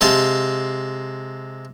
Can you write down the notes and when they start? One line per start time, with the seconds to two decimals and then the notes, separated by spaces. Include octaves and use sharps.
0.01 C3 G#3 F5 A5 C6